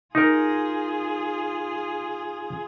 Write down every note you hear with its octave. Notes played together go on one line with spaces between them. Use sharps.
D#4 F4 G#4 A#4